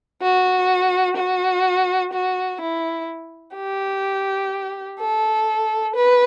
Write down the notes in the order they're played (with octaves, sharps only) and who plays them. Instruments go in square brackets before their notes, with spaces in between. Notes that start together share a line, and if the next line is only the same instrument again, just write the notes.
[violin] F#4
F#4
F#4
E4
G4
A4
B4